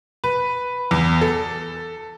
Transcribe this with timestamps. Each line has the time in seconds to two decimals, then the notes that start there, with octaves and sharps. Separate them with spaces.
0.24 B4
0.91 E2
1.21 A4